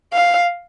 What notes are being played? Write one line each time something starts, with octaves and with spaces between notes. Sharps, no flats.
F5